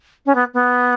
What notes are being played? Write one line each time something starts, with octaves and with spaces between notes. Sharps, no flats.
C#4
B3
B3